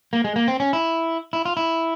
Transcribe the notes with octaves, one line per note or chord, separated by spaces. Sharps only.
A#3
G#3
A#3
C4
C#4
E4
E4
F4
E4